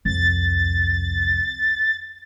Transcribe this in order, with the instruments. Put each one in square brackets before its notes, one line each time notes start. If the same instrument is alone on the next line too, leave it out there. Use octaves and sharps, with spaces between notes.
[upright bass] C2 F2 [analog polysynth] A6